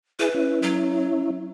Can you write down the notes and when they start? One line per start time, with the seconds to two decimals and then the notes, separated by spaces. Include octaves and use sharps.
0.19 E4 G#4 B4
0.34 C#4 E4
0.62 F#3